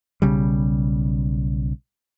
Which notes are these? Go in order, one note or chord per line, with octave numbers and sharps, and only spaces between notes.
B1 C#3 G3